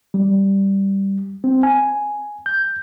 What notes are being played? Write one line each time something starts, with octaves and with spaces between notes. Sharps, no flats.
G3
C4
G#5
G6